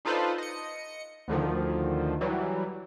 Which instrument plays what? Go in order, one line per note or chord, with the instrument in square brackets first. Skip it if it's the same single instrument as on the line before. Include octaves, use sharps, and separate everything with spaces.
[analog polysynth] D4 D#4 F4 A4 B4 C5
D#5 C#7
D2 D3 D#3 F3
E3 F#3 G3